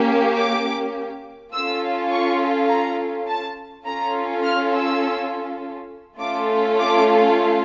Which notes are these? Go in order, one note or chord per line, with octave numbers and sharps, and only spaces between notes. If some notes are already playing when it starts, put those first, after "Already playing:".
Already playing: A#3 C#4 G4
D6
C#4 F4 A4 E6
C#6
A#5
A5
C#4 F4 A4 A#5
F6
E6
A3 C#4 F4 A4 D6
D6